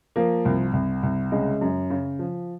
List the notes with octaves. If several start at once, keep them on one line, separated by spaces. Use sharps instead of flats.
F3 A#3
C2
C2
C2
C#3 G#3
F#2
C#3
F3